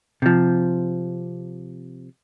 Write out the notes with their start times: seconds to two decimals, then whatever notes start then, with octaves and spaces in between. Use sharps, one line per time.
0.22 C3 F3